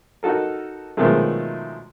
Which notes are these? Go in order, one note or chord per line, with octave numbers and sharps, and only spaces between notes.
D#4 F#4 A4 A#4
B2 D#3 F3 F#3 G#3 A3